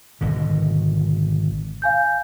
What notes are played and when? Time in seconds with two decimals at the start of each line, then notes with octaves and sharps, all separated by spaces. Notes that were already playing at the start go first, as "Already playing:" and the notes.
0.21 G#1 B2 D3
1.82 F5 G#5 G6